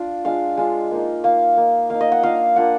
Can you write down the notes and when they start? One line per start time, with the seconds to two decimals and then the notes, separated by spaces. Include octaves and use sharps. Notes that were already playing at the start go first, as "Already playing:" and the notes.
Already playing: D4 F4
0.25 G#3 D4 F4 F5
0.57 G#3 D4 F4
0.91 A#3 D#4
1.24 A#3 D#4 F5
1.57 A#3 D#4
1.90 A#3 D#4 F5
2.01 D#5
2.12 F#5
2.23 A#3 D4 F4 F5
2.56 A#3 D4 F4 F#5